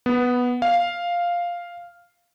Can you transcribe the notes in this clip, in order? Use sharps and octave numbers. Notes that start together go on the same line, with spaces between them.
B3
F5